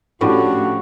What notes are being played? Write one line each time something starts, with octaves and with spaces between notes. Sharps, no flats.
A2 F3 A3 C#4 D4 F#4 G4